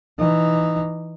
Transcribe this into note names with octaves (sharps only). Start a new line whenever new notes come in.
E3 D#4